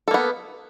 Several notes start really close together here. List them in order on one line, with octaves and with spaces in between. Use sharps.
A4 A#3 B3